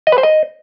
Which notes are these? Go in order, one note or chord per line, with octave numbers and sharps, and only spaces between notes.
D#5
B4
C5
D#5